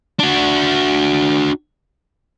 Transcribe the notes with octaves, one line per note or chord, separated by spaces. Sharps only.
D4 F#4